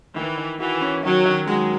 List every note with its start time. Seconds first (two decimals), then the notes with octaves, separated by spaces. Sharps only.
0.16 D#3 E3
0.38 D#3
0.60 E3 F#4
0.81 C#4
1.03 D#3 F#3
1.26 D#3
1.47 F#3 G#3